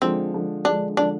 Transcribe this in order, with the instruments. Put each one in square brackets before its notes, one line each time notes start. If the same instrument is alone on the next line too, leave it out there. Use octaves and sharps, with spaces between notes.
[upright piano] D3 F3 G#3 [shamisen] C4
[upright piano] D3 F3 G#3
[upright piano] D3 F3 G#3 [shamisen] D4
[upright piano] D3 F3 G#3 [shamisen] D4